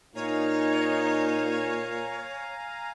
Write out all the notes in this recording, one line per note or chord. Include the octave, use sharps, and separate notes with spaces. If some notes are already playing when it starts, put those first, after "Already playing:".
A#2 D#4 C#5 F5 G#5 A#5